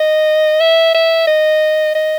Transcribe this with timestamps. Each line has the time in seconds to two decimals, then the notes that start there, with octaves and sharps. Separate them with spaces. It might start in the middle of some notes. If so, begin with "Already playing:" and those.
Already playing: D#5
0.60 E5
0.94 E5
1.27 D#5
1.95 D#5